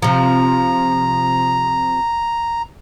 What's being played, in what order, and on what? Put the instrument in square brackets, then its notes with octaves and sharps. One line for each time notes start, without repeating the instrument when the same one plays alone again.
[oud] C3 F3 [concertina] A#5